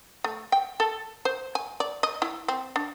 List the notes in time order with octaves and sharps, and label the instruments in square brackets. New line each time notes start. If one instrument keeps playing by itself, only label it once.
[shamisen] A3
G5
A4
C5
G#5
D5
D#5
E4
C4
D4